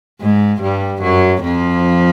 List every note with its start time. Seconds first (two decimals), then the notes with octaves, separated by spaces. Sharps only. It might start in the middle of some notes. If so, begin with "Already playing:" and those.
0.21 G#2 G#3
0.62 G2 G3
1.02 F#2 F#3
1.43 F2 F3